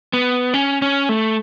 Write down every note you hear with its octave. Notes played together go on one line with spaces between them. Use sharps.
B3
C#4
C#4
A3